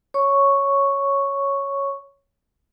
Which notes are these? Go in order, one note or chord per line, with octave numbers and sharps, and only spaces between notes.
C#5 C#6